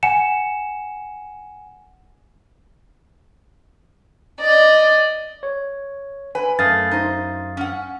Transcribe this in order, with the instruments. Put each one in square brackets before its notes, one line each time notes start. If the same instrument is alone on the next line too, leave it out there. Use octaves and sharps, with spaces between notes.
[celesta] F#5 G#5 C#7 E7
[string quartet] D5 D#5
[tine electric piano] C#5
[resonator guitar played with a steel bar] B4 [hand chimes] G#5
[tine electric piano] F#2 F5 D#6 [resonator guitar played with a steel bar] A3 [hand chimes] A6
[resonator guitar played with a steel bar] D#4 C5
C#4 F#5